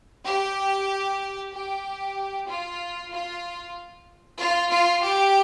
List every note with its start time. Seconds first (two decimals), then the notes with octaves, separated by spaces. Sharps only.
0.25 G4
1.52 G4
2.47 F4
3.11 F4
4.38 F4
4.69 F4
5.02 G4